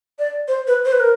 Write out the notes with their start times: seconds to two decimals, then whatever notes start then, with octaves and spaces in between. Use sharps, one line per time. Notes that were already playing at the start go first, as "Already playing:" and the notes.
0.19 D5
0.48 C5
0.67 B4
0.85 C5
0.92 B4
1.00 A#4